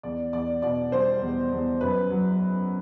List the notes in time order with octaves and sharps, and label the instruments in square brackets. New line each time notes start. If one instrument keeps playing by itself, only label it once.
[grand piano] E2 D5
E2 D5
B2 D5
G3 C5
E2
E2
F#2 B4
F#3